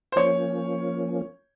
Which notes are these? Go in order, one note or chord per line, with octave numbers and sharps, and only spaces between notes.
C5
F3 A#3 C#4 C#5